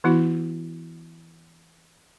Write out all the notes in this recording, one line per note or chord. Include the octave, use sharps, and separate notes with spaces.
E3 B3 E4 F#4